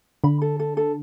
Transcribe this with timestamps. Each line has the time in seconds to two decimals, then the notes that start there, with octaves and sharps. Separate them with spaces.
0.24 D3 B5
0.42 A4
0.60 A4
0.77 A4